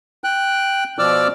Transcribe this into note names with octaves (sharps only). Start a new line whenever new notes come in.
G5 F#6
B2 F3 D5 D6 E6 F6